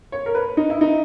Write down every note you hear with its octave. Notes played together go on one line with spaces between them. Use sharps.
C#5
A#4
B4
D#4
E4
D#4